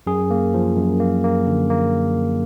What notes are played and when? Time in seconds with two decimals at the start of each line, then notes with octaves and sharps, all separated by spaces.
0.07 F#2 G#4
0.31 A#3
0.54 F3
0.77 F#2
1.00 A#3
1.24 A#3
1.47 D3
1.70 A#3